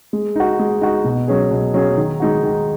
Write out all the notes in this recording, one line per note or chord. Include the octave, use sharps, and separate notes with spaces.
G#3
D#4 F#4
G#3
D#4 F#4
B2
F#3 C#4 G#4
B2
F#3 C#4 G#4
D#3
G#3 D#4 F#4
D#3